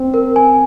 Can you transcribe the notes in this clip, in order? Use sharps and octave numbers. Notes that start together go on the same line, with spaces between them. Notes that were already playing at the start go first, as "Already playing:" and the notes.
Already playing: C4
A#4
G#5